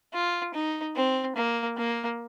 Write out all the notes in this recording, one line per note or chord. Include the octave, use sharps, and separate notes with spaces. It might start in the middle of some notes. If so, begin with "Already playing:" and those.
F4
D#4
C4
A#3
A#3